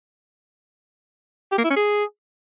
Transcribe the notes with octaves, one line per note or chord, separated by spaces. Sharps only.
G4
A#3
E4
C#4
G#4